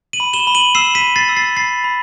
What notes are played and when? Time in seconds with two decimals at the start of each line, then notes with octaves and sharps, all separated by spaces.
0.13 D#7 F#7
0.20 B5
0.33 E7 G7
0.47 B5
0.55 D#7 F#7
0.75 E6 C7 E7
0.95 B6 D#7
1.01 B5
1.16 A6 C7
1.29 E6
1.37 A6 C7
1.57 B5 A6 C7
1.84 B5